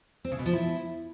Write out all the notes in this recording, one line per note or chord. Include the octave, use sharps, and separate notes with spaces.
C4
C#3
B2
F3
E4